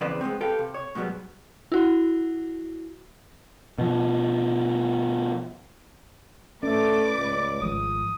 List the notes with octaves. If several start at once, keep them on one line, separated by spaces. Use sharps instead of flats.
E2 C#3 C4 E4 B4 D5
G#3 A3 B3 C4
G4 A4 B4 F5 G5
C3
C#5
G#2 B2 F#3 G3 B3
E4 F#4
B2 F3
A2 A3 C#4 B4 D5 D6
C#2
G#1 F3 G#3 D#6